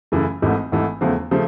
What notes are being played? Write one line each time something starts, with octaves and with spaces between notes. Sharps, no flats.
F#2 C#3 E3 A3
G#1 G#2 E3 A3
G#1 G#2 E3 A3
E2 C#3 F3 A3
C#3 F3 A3